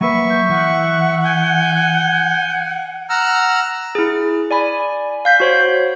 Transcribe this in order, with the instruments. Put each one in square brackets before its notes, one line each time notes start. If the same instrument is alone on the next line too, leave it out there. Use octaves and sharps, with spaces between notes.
[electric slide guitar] F#3 A#3 B4 [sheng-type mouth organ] E5 C#6 [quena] B5
[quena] G6
[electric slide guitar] E3 [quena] F#5
[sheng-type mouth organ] G#5 G6
F#5 A#5 E6 F6
[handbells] E4 G#4
D5 G#5 B5
F5 G6 B6
F#4 C5 C#5